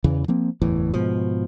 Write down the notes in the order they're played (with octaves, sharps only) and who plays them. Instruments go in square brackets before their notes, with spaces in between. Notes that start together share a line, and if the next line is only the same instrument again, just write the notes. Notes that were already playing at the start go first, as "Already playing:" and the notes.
[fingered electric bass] E2 C#3 E3
F3 A#3 C4
F#1 E2 A2 E3
G#2 B2 F3